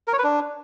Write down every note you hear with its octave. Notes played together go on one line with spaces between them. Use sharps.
A#4
C#5
B4
D4